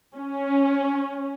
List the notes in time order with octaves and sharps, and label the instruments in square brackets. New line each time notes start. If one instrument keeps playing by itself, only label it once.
[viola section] C#4